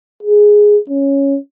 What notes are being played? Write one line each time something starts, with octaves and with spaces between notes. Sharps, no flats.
G#4
C#4